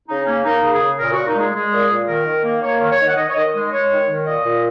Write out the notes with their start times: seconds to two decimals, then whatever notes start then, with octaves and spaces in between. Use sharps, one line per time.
0.08 C#3 D#4
0.26 A#3 C#4
0.44 A#3 D#4
0.63 C#3
0.71 G#4
0.81 C#3
0.99 A#2 A#4
1.13 A#2 F#4
1.26 D#4
1.36 G#3 G#4
1.54 G#3 G#4
1.72 A#2
1.89 A#2
2.08 D#3 A#4
2.26 D#3
2.44 A#3
2.62 A#3 C#5
2.80 D#3
2.90 C#5
2.99 D#3
3.07 F#5
3.17 D#3 D#5
3.29 C#5
3.35 D#3 D#5
3.53 G#3 D#5
3.71 G#3 C#5
3.90 D#3
4.08 D#3
4.25 A#2 D#5
4.45 A#2